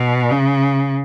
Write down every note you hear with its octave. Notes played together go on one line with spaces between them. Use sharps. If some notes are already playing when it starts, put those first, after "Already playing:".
Already playing: B2
C#3